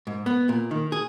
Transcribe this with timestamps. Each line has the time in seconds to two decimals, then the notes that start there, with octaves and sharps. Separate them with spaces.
0.07 G#2
0.26 B3
0.49 A#2
0.71 D#3
0.92 G#4